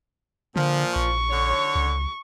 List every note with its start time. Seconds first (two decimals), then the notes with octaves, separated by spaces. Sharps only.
0.56 A#2 D3 F3
0.96 A#1 C#6
1.30 D3 C#5
1.75 C#2